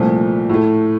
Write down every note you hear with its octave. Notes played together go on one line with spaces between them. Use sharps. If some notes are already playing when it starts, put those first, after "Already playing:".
Already playing: C2 A#2 F3 A3
A2 A3